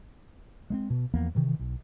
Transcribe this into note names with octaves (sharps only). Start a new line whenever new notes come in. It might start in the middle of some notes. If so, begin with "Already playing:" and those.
G#3 A#3 C4
B2
E2 F3 A#3 B3
C3 D#3 E3
B1